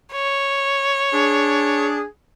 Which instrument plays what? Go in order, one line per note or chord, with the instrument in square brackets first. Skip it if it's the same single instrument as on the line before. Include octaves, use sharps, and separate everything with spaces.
[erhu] C#5
[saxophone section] D4 G#4